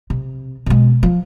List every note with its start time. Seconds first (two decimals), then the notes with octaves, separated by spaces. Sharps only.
0.10 C3
0.66 B2 G#3
1.03 F3